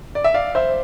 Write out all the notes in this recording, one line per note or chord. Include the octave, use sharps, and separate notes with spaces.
D5
E5
D5 F5
C5 E5